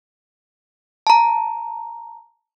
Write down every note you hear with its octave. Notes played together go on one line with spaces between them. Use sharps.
A5 A#5